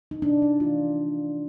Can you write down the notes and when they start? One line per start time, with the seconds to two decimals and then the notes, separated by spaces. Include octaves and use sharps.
0.11 D#4
0.22 C3 D4
0.42 D#4
0.60 E3 A3 F4